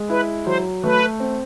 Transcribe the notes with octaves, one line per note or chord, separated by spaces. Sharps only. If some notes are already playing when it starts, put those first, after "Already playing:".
Already playing: G#3
E4 B4
F#3 C5
A3 B4
C4